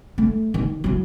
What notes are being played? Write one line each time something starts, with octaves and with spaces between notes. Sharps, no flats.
A3
D#3
F#3 E4